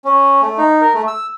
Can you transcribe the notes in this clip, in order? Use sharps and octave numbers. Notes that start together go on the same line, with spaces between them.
C#4
A3
D#4
A#4
A3
E6